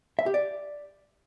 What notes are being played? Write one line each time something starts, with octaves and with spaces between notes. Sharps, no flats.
E5
G4
D5